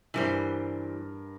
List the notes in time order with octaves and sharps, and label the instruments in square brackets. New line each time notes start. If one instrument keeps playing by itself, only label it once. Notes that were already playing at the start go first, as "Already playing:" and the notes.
[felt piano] G2 A#4 G#5 [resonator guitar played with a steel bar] E3 G3 C5